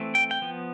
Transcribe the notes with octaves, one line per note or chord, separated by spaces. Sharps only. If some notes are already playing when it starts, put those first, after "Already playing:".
Already playing: E3 A3 C4
G5
G5
F3 B3